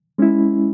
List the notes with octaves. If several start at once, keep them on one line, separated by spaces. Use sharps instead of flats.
G#3 C#4 E4